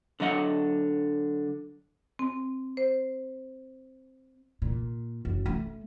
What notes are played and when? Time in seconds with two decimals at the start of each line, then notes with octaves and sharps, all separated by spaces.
0.20 D3 F#3 D#5 F#5
2.19 C4
2.77 C5
4.62 A#2
5.25 F#1
5.46 A3